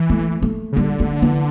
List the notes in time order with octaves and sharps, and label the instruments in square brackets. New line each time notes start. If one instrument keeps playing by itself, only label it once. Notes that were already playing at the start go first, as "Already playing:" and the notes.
Already playing: [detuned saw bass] E3
[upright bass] A3
A3
[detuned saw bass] C#3
[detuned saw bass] D3 [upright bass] G3
[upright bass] A3
E3